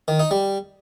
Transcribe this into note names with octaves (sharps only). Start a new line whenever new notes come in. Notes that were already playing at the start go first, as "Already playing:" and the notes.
D#3
D#4
G3